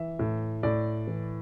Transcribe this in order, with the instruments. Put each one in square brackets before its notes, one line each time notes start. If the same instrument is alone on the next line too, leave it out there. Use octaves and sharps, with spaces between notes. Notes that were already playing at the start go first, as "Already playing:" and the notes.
Already playing: [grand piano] E3 E5
A2
A2 D5
E3